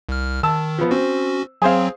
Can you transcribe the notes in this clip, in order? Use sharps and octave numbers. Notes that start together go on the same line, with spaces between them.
C2 F6
D#3 A5 E6
F3 B3
C4 C#4 F#4
F#3 C4 G#4 C5 F5